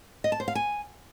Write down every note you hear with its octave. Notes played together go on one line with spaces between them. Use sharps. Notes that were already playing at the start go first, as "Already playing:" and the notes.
D#5
A5
C5
F5
G#5